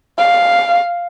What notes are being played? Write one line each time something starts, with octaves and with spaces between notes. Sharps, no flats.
F5